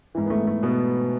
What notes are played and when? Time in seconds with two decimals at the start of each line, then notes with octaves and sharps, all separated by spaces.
0.15 G#2 E3
0.26 B3
0.30 A3
0.47 A3
0.63 B2 B3